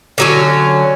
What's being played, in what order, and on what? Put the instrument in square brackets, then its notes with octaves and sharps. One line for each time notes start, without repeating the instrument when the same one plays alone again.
[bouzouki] D3 F#3 C#4